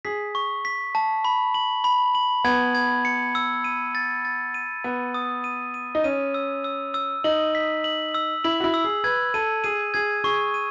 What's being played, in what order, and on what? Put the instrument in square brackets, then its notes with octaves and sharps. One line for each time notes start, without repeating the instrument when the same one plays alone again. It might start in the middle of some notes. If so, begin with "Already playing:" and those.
[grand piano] G#4 [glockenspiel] B6
[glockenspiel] C#6
B6
A5
B5
F#7
B5
F#7
[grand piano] B3 [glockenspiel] G#6
[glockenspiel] G#6
C#7
E6
D#7
A6
A6
D#7
[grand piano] B3 [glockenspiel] D#7
[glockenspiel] D#6
D#7
D#7
[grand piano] D#4
[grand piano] C#4 [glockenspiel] D#7
[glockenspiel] E6
E6
E6
[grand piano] D#4 [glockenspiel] F#7
[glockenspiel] B6
F#7
E6
[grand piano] E4 [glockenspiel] F#7
[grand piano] F#4
E4
[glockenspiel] E6
[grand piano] G#4
[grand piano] B4 [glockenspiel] G#6
[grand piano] A4 [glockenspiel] D#7
[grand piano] G#4 [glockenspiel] D#7
[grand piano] G#4 [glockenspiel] G#6
[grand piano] G#4 [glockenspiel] C#6
[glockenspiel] D#7